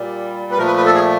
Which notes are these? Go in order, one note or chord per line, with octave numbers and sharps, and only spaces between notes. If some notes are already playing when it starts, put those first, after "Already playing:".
Already playing: A#2 G3
B4
A#2 F3 A3 A#4
B4
B4
A4
G#4